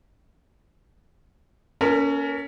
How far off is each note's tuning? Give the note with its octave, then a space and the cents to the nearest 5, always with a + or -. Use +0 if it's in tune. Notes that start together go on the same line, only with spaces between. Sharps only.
A#3 +35 C#4 +20 A#4 -40